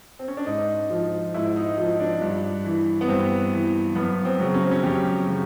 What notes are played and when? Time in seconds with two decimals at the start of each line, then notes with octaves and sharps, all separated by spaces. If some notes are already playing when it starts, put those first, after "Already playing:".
0.19 C4
0.28 C#4
0.37 D4
0.46 G#2 D#4
0.90 F3
1.34 G#2 E4
1.56 D#4
1.78 F3 D#4
2.00 D4
2.21 G2
2.65 E3
3.01 B3
3.08 G2 C4
3.52 E3
3.96 F#2 B3
4.25 C4
4.40 C#3 F#3
4.54 C#4
4.63 C4
4.71 C#4
4.83 F#2 G4
5.27 C#3 F#3